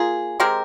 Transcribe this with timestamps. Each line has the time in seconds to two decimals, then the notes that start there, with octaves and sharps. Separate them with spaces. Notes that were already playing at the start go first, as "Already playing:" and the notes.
Already playing: A#3 F4 G#4
0.40 G#3 C4 G4 A#4